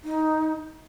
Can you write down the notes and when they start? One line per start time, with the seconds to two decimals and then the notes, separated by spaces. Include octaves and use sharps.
0.04 D#4